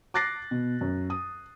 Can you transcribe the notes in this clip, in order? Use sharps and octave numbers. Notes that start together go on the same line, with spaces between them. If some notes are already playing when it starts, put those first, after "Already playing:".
D6 F#6 A6 A#6 C7
B2
F#2
D#6